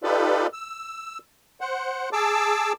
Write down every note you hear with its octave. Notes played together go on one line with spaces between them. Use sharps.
D#4 F4 G4 A4 B4 D5
E6
C5 F#5
G#4 A5 D6 E6